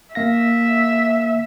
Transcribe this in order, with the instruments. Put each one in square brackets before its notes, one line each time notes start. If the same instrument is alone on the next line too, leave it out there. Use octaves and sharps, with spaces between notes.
[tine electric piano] A#3 F5 A#6 [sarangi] E5